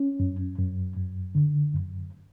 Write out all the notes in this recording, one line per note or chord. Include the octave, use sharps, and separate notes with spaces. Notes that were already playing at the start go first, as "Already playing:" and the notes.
Already playing: C#4
F#2
F#2
F#2
D3
F#2